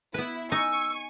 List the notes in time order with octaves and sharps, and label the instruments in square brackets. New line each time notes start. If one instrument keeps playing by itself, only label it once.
[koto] B3 B4 [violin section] E4
[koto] D#4 [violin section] G#5 C#6 [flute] E6